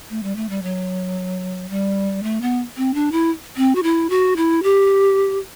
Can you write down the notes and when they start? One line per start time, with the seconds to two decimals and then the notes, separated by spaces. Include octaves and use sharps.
0.10 A3
0.23 G3
0.36 A3
0.49 G3
0.63 F#3
1.69 G3
2.23 A3
2.41 B3
2.77 C4
2.94 D4
3.12 E4
3.57 C4
3.75 F#4
3.83 E4
4.10 F#4
4.36 E4
4.63 G4